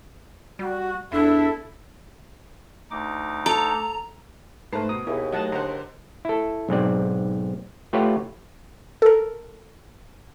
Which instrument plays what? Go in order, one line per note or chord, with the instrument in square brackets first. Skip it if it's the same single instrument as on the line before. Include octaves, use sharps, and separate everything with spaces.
[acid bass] G3 [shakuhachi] F#4
[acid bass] E2 [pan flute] D4 [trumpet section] E4 [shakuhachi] A4
[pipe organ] D2 D#4 D6
[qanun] A4 [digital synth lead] A#5
[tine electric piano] G#2 A3 [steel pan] B4 C5 [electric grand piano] A5 A#5 C7
[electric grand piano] B2 A#5 [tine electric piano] D#6
[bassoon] D#2 [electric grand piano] B2 [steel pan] E4 G#4
[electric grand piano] F#3 A3 [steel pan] D#5 F#5 A5
[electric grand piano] D3 C5 [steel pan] F#5 A#5
[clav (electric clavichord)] E4 A4
B1 G#2 C4 D5
A3 F4 G4 B4 C#5 F#5
[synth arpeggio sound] A4 A#4